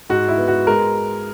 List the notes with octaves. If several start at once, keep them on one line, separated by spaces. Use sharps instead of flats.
G#2 F#4
E4
B3
F#4
G#3 A#4